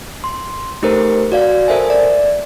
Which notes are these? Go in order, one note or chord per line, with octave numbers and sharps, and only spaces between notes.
C6
A3 D#4 G4 A4 A#4 C5
F#4 D5 F5
A4 A#4 C5 E5 G#5
D5